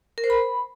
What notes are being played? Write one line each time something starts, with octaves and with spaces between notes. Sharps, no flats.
A#4
C5
B5